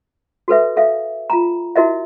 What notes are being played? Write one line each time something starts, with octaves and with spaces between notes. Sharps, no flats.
F#4 A4 B4 E5
A4 E5 F5
F4 A5 A#5
E4 F#4 A#4 D#5 E5